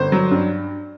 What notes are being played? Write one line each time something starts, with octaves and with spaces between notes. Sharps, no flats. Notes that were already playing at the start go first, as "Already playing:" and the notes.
Already playing: G1 C5
F#3
G2